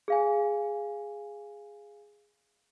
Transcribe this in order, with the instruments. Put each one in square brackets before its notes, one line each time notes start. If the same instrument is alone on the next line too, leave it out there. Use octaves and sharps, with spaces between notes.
[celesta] G#4 F5 G#5